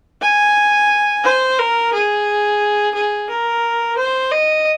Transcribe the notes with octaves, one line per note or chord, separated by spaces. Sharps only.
G#5
C5
A#4
G#4
G#4
A#4
C5
D#5